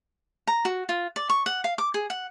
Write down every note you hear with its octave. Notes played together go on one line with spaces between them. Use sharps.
A#5
F#4
F4
D5
C#6
F#5
F5
D6
G#4
F#5